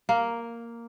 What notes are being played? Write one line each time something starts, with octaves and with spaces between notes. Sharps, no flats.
A#3